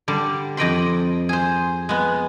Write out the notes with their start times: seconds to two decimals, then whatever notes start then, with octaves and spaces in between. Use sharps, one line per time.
0.08 D3 G3
0.57 F2 D5 D#5 G5 B5 C6
1.29 G#4 C5
1.89 G#3 B3